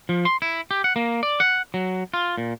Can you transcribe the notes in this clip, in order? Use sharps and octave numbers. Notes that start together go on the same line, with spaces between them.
F3
C6
E4
G4
F#5
A#3
D5
F#5
F#3
F4
A#2